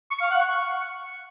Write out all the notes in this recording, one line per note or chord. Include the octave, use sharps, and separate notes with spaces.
C#6
F5
F#5
C#6